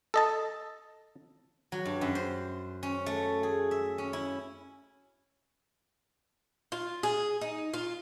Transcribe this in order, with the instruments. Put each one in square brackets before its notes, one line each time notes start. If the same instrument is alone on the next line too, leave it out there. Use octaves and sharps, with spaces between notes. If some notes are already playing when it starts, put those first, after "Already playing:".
[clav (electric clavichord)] A4 D#5 A5
[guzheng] F#3
G2
F#2
C5
C#4
A3
G#4
E5
C#4
E4
[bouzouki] F4
G#4
D#4
F4